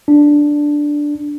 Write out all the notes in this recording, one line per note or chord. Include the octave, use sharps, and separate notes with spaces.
D4